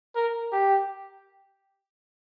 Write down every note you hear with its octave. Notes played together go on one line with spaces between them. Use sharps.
A#4
G4